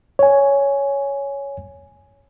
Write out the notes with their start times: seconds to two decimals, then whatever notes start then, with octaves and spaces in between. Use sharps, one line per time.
0.19 C#5 G#5